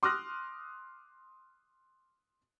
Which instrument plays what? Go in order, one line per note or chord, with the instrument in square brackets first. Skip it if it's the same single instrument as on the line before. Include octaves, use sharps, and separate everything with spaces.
[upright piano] C6 D6 D#6 F6 F#6 A#6